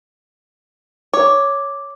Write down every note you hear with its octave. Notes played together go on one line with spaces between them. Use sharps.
C#5 D6